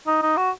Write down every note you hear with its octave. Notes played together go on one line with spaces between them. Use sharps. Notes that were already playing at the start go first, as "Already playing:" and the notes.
D#4
D#4
F#4